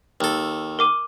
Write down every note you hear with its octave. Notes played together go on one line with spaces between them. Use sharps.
D#2 A4
A#4 D6 D#7